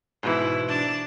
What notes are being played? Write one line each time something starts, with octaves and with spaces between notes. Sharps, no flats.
G#2 B2 E3 E4
D4 A5